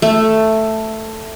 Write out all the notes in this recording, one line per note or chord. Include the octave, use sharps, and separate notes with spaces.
A3